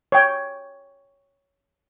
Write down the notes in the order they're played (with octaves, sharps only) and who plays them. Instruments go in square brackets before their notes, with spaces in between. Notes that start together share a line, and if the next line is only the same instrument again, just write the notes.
[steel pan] C#5 G5